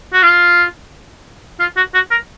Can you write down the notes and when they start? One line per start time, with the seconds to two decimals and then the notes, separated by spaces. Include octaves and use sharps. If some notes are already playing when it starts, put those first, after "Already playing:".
0.13 F#4
0.23 F4
1.60 F4
1.77 F#4
1.94 F#4
2.11 A#4